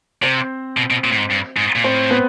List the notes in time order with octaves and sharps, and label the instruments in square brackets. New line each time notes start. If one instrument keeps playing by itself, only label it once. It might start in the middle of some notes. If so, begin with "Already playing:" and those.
[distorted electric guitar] C3 [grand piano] C4 C5
[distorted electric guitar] B2
B2
A#2
A2
G#2
G2
G#2
A#2
[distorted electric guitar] A2 [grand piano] C4 C5
[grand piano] B3 B4